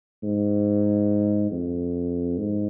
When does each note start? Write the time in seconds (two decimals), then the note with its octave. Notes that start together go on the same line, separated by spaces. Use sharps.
0.23 G#2
1.51 F2
2.38 G#2